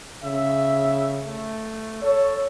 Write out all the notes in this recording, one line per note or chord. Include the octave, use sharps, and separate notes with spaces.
C#3 E5
A3
A4 C#5